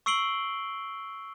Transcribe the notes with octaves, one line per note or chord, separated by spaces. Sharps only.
C#6 E6 C7 D7 F#7 G7